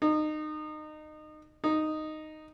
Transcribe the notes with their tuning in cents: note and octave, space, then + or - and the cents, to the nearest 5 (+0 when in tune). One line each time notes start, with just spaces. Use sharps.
D#4 -25
D#4 -5